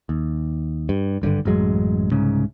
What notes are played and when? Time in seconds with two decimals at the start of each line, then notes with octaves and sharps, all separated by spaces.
0.09 D#2
0.89 G2
1.22 G#1 G2 B2 D3
1.45 A1 F#2 F#3 G#3
2.12 C2 G#2 C#3